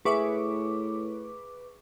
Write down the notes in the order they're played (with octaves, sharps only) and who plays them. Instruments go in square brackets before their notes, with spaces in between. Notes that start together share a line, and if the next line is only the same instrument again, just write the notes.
[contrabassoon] A2 [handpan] G#4 [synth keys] B4 D6 [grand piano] E5 C#6